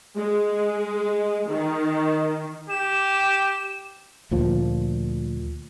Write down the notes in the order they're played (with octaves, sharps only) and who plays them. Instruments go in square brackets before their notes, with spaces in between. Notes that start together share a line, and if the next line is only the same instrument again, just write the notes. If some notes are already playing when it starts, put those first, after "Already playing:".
[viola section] G#3
D#3
[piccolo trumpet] G4 [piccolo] E7
[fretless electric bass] D2 A#2 F3